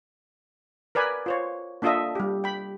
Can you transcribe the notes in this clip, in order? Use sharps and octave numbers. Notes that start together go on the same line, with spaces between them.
A#4 B4 D5 G#5 B5
F4 C5 C#5
A#3 D4 F4 A4 D#5 E5
G3 G4
G5 B5